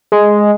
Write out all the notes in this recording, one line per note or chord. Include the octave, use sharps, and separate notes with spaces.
G#3